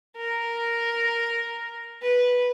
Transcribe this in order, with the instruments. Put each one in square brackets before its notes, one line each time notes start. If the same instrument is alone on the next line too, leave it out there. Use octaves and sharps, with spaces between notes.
[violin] A#4
B4